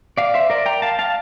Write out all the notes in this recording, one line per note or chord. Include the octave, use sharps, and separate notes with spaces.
D5 F5
C5 E5
A#4 D5
G5 A#5
F5 A5
F5 A5